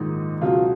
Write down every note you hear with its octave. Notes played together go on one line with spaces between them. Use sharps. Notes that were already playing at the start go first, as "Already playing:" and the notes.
Already playing: A#1 G#2 D#3 D#4
C#2 B2 F#3 F4